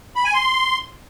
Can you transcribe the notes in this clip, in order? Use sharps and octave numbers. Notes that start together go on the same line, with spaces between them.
B5
G#5
C6